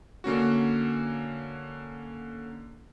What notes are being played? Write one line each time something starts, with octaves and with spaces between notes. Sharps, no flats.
D3 A#3 C#4 F#4